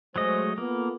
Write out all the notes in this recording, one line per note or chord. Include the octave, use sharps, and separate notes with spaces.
F#3 G#3 A3 C5 D#5
A#3 B3 F4 A4